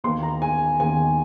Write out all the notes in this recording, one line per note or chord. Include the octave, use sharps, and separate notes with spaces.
D#2 D#3 A#3 C6
A#5
G#5
D#2 D#3 A#3 G#5